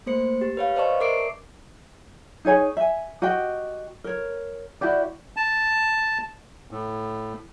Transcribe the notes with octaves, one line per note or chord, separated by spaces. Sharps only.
A3 A#3 C5 C#7
G4
B4 C#5 F5
B4 C5 D5 D#5 A5 C#6
A#4 D5 E5 D6 C7 D7
D#4 G#4 C#5 G#5
E5 G#5
F#4 G4 D#5 G5
A#4 C#5
E4 F#4 G4 D5
A5
A2